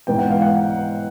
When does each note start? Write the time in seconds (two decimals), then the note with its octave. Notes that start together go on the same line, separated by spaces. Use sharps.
0.07 G#2 E3 G#3 B3 G5
0.19 F#5
0.30 F5
0.42 F#5